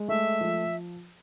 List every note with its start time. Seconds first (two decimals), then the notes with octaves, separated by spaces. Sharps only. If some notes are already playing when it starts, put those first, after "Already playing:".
Already playing: G#3
0.08 A3 E5
0.41 F3